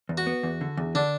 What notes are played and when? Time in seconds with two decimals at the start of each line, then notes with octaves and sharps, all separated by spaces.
0.09 E2
0.18 F#4
0.27 B3
0.43 E2
0.61 D3
0.77 E2
0.95 D3 D4